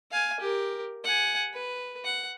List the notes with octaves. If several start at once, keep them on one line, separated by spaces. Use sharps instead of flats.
F5 G#5
G4 A#4
F#5 G#5
B4
F#5